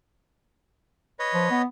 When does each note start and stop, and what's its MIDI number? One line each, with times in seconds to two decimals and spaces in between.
1.19 1.62 71
1.19 1.62 73
1.19 1.62 75
1.34 1.48 53
1.50 1.65 59